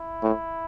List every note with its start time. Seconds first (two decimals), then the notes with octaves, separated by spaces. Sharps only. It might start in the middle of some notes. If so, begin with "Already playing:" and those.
Already playing: E4
0.22 A2